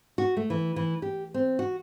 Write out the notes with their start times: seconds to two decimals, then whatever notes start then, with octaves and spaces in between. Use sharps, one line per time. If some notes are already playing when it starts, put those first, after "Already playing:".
0.18 F#4
0.37 A3
0.50 E3
0.76 E3
1.02 G4
1.34 C4
1.59 F#4